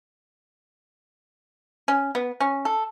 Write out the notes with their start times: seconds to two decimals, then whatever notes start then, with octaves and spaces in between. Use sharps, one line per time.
1.88 C#4
2.15 B3
2.40 C#4
2.65 A4